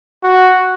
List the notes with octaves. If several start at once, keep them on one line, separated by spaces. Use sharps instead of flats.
F#4